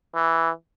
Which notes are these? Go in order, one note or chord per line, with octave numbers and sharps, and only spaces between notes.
E3